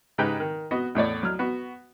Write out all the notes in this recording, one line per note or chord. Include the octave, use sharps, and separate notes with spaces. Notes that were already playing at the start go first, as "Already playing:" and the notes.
G#2 C#3 D#4 G4 B4 G5
D#3
B3 F#4 D#5
E2 A2 C#5 D5
F#3 F6
B3 F#4